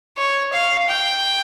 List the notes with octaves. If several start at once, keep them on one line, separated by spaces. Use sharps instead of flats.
C#5
F5
G5